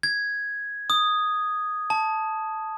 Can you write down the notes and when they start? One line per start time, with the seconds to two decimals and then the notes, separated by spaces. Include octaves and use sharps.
0.03 G#6
0.90 D#6
1.90 A5